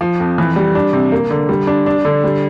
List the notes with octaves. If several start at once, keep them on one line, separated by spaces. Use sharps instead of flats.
F3
F2
E3
G3
D4
C3
A#3
D3
G3
D4
D4
D3
G3